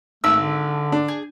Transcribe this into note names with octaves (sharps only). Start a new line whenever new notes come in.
G#1 A3 E6
D3
D4
G#4